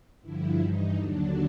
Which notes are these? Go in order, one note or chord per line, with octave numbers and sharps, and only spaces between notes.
G2 D3 F3 E4
G2 E3 D#4
D#2 D3 F#3 D4